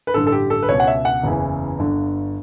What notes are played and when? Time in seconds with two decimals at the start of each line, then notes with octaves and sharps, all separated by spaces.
0.07 B4
0.14 A1 G2 D3 A4
0.27 A4
0.32 G4
0.50 A4
0.63 B4
0.69 C#2 B2 C#5
0.80 F#5
0.87 E5
1.05 F#5
1.24 F#1 E2 C#3 E3
1.79 G1 G2 D3